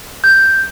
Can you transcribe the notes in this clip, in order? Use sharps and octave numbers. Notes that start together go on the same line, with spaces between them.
G6